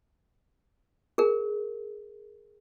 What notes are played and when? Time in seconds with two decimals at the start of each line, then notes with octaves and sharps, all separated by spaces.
1.18 G#4 A#4